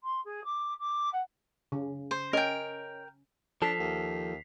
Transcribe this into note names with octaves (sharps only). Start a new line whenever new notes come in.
C6
G#4
D6
D6
F#5
C#3
C5
C#4 A#4 C#5 D#5 G5
F3 D4 A4 B6 C7 F7
D#2